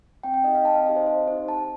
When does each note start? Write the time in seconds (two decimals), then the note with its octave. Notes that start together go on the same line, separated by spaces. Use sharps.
0.23 C4 G5
0.34 G5
0.44 D#4 G4 D#5
0.55 F5
0.65 C4 A5
0.76 F5
0.86 D#4 G4 D#5
0.96 C5
1.07 C4 C5
1.28 D#4 G4 C5
1.48 C4 A5